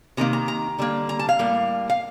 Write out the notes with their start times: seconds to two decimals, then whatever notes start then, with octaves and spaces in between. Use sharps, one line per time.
0.17 C3 D#3 A#3 A#5
0.33 A#5
0.48 A#5
0.78 D3 G3 A#3
1.09 A#5
1.19 A5
1.29 F5
1.39 A2 G3 A#3
1.90 F5